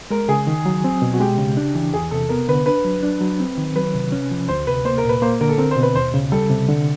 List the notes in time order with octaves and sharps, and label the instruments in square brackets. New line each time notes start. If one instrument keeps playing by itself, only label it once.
[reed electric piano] G#3 [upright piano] A#4
[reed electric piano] C#3 [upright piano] G#4
[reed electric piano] D#3
F#3
C4
B2
[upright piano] F#4
[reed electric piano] G#3 [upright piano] G4
[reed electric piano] C#3
D4
E3
[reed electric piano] E2 [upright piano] G#4
[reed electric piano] C3 [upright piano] A4
[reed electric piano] B3 [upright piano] A#4
[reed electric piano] D3 [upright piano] B4
[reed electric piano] D4 [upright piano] B4
[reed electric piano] F#3
D4
F#3
C4
D#3
[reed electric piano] F#3 [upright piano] B4
[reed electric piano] C3
C#4
F3
[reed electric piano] D2 [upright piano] C5
[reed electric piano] C3 [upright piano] B4
[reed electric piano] A#3 [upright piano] C5
[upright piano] A#4
[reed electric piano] A#2
[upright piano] B4
[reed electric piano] A#3 [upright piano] C5
[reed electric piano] D3 [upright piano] A#4
[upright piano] A4
[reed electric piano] C4 [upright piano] A#4
[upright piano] C5
[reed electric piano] B2
[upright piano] B4
[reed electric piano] D#2 [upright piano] C5
[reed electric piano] C#3
[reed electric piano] G3 [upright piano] A4
[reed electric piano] C3
D3